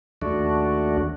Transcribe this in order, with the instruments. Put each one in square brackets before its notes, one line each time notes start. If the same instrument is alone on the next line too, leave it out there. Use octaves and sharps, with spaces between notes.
[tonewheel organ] D#2 A3 D4 F#4